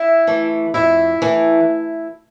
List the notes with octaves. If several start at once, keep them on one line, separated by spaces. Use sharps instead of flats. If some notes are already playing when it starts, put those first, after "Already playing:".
Already playing: E4 E5
E3 A3
F2 E4 E5
E3 A3